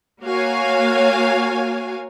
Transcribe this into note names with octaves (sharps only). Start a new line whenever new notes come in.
A#3 F#4 C#5 F5 G#5